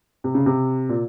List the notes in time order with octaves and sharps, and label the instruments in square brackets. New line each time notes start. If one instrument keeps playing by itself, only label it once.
[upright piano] C3
C#3
C3
A#2